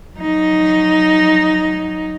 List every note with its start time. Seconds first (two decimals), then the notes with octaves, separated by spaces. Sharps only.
0.16 F#3 D#4